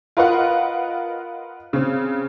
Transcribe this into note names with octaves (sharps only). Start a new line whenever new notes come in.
F4 A#4 B4 D#5 F5 F#5
C#3 C4